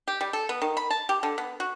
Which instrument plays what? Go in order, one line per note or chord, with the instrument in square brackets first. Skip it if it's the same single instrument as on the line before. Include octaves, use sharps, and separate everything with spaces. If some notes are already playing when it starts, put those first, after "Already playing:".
[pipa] G4
G3
A4
B3
D#3
B5
A5
G4
D3
B3
F#4